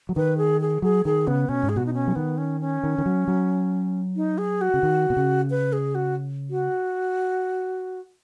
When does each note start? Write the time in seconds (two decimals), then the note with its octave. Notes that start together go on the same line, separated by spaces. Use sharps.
0.09 F#3
0.16 D#3 B4
0.38 G#4
0.61 G#4
0.82 F#3 G#4
1.05 D#3 G#4
1.27 C#3 B3
1.49 B2 C#4
1.63 G#2
1.69 G#4
1.76 B2 F#4
1.86 D#4
1.94 C#4
2.08 F#3
2.16 D#3 B3
2.38 C#4
2.61 C#4
2.83 D#3
2.98 D#3
3.06 F#3
3.28 F#3
4.16 D#4
4.38 G#4
4.61 F#4
4.74 C#3
4.83 D#3
5.10 B2
5.17 C#3
5.50 B4
5.73 G#4
5.95 F#4
6.50 F#4